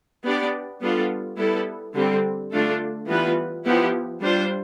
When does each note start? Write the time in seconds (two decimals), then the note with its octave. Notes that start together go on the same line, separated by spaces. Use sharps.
0.24 B3 D4 G4 D5
0.81 G3 B3 D4 F4 A4
1.37 G3 B3 E4 A4
1.94 D3 G3 C4
2.51 D3 A3 D4 F4 A4
3.08 E3 G3 B3 F4 B4
3.65 F3 B3 E4 G4
4.22 G3 D4 F4 C5